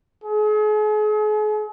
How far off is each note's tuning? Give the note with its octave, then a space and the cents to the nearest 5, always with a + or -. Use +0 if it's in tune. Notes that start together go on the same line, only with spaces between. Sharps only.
G#4 +40